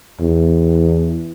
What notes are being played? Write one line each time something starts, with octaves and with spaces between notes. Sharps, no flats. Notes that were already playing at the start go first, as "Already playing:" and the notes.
E2